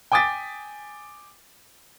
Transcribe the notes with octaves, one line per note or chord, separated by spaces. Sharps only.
G5 G#5 D6 D#6 A6 B6